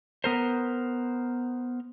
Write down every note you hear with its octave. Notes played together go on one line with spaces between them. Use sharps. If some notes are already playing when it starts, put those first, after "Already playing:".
B3 A#4 C5